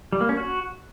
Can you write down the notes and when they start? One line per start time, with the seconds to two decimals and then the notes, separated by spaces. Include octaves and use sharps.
0.12 G3
0.21 A#3
0.29 C#4
0.37 F#4